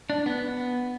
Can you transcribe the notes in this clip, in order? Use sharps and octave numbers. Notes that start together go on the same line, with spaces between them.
D4
B3